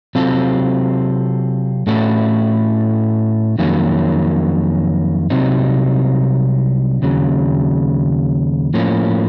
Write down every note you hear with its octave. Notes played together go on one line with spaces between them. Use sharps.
C3 F#3 C4 F4 A4
A2 A3 C#4 F#4
F2 D#3 F#3 A#3 C#4
C2 C3 F#3 C4 D#4
D#2 C#3 F#3
A2 F3 A#3 C#4